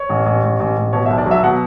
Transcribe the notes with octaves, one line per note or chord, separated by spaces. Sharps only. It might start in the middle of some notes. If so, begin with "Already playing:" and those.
Already playing: C#5
A1
A1
A1
A1
A1
B2 C#5
E5
B1
D5
F#3 E5
B2 F#5